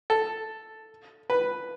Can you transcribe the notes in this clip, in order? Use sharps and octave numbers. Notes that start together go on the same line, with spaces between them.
A4
B4